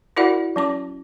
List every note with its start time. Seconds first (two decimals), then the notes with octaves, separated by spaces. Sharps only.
0.16 E4 F#4 A#4 D5 E5 F#5
0.56 F#3 C#4 D6